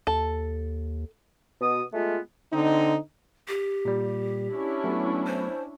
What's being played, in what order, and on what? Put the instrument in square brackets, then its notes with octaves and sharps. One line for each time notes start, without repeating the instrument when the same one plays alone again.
[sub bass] D#2 [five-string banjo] A4
[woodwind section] B2 D#6
G#3 A3 B3 F4
[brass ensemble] D3 C4 D#4
[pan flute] G4
[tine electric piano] A#2 G3
[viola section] C#4 D4 E4
[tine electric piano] F#3 A3 B3
[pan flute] C5